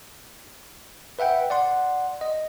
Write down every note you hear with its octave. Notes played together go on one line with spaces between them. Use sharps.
B4 E5 F#5 G5
D5 F#5 C6
D#5